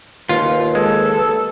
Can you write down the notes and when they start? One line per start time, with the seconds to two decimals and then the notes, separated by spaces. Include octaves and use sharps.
0.29 D#2 F4 B4
0.75 G#3 A4